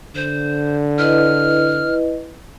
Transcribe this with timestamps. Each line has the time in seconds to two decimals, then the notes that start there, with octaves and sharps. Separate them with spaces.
0.15 D3 C5
0.98 E4 B4 D#5 F6